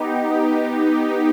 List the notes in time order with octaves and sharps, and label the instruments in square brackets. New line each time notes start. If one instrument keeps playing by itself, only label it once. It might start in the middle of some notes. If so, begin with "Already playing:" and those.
Already playing: [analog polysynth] B3 D#4 G4